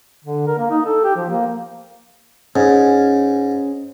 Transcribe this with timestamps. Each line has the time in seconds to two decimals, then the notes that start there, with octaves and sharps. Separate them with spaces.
0.24 D3
0.47 A#4
0.59 A#3
0.70 D#4
0.86 A4
1.04 G4
1.16 F3
1.30 A#3
2.56 G#2 C#4